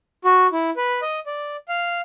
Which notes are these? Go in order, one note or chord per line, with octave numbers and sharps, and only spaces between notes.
F#4
E4
B4
D#5
D5
F5